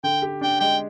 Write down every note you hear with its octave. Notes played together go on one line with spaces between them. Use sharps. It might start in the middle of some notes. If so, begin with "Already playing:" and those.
D3 G5
G4
D4 G5
G#3 G5